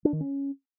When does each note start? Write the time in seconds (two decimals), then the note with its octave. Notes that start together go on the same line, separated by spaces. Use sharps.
0.05 D4
0.13 D#3
0.21 C#4